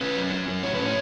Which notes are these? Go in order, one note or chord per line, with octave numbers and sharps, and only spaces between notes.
C#4 B4
F#3
C#4
F#3
A2 C#5
C#4 B4
C#5